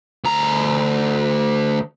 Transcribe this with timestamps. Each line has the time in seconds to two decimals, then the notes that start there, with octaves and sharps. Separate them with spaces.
0.24 D2 A#5